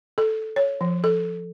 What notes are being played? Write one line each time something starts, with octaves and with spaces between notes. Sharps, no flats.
A4
C#5
F3
A4